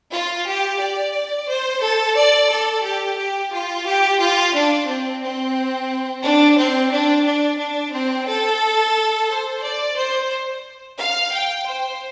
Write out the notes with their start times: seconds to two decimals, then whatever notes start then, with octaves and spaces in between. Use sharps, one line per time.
0.12 F4
0.46 G4
0.80 D5
1.48 C5
1.82 A4
2.16 D5
2.50 A4
2.84 G4
3.18 G4
3.52 F4
3.86 G4
4.20 F4
4.54 D4
4.88 C4
5.22 C4
6.23 D4
6.57 C4
6.91 D4
7.25 D4
7.59 D4
7.93 C4
8.27 A4
9.29 C5
9.63 D5
9.97 C5
10.99 F5
11.33 G5
11.67 C5